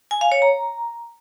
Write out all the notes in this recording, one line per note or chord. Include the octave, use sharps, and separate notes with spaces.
G#5
F5
C#5
A#5